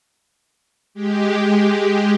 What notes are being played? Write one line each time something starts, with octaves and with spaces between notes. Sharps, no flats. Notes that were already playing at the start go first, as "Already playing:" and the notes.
G#3 G4